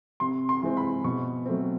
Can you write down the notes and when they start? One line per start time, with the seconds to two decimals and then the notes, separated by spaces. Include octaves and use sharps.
0.20 C3 C6
0.49 C6
0.62 E3 G#3 C4
0.77 B5
1.04 B2 C#6
1.46 F#3 A3 C4